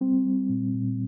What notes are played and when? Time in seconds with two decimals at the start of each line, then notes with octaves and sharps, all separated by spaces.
0.01 G3 C4
0.26 G3
0.49 A#2
0.74 A#2